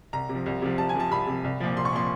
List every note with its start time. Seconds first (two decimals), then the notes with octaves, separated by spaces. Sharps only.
0.13 C2 A#5
0.29 C3
0.35 F3
0.46 C2
0.62 C3 F3
0.78 C2 A5
0.89 G#5
0.95 C3 F3 A5
1.11 C2 B5
1.27 C3 F3
1.44 C2
1.60 A#2 F3
1.77 C2 C6
1.85 C#6
1.93 A#2 F3 C6